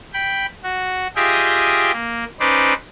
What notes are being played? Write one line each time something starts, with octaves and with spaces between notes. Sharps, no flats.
G5 B5
F#4
F4 G4 G#4 D#5 E5 G5
A#3
C#4 D#4 B4 C5 D5